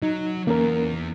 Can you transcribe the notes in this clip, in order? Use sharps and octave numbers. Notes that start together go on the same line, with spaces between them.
F#3 D#4
E2 A#3 C#4 A#4